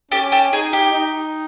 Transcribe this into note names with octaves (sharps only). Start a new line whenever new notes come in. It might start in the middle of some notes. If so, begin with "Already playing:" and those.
C#4 G4 A4
G4 A4
D#4 G#4
G4
D#4